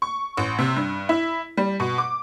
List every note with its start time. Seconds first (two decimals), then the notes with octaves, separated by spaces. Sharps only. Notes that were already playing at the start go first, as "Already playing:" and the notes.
0.02 C#6
0.37 A1
0.59 C3
0.76 G2
1.09 E4
1.57 G3
1.80 B2
1.98 D6